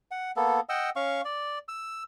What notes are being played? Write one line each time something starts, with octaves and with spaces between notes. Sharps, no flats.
F#5
A#3 B3 A4
D#5 F#5 G5 E6
C#4 F5 C#6
D5
E6